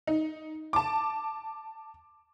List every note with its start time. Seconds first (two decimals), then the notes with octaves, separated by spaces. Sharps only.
0.07 D#4
0.73 A5 D6